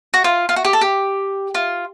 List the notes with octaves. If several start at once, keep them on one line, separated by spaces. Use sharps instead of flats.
F#4
F4
F4
F#4
G4
A4
G4
F4